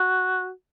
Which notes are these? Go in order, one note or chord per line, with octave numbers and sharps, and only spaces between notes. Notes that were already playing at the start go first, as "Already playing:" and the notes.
Already playing: F#4